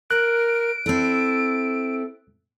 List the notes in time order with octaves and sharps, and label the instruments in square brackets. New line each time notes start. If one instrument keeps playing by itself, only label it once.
[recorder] A#4 [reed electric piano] F#6 [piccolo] D7
[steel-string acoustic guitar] C4 E4 [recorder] A4